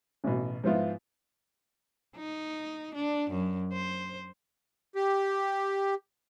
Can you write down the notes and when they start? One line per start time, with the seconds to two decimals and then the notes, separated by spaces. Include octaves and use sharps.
0.24 A1 B2
0.64 G#2 F3 B3 E4 F4
2.16 D#4
2.94 D4
3.30 F#2
3.73 C5
4.95 G4